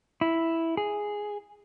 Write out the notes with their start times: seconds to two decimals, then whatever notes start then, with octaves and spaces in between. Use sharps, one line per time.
0.21 E4
0.77 G#4